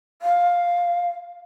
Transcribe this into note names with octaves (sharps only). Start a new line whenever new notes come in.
F5